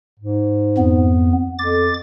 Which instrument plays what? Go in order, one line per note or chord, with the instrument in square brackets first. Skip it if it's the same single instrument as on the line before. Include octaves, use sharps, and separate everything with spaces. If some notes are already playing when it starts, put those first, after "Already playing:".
[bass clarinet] G#2
[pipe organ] F2 B3
[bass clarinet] F2 [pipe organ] D6 A6